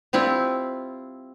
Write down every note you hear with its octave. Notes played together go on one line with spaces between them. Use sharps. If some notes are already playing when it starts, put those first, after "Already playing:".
G3 C4 E4 F4